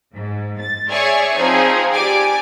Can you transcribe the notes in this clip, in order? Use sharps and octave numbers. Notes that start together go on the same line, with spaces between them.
G#2
A6
G#4 C#5 D5 E5 G#5 C#6
F3 C4 D#4 G#4
G4 D5 G#5 D6